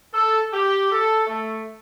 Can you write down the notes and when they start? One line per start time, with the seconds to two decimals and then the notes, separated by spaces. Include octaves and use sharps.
0.14 A4
0.53 G4
0.91 A4
1.27 A3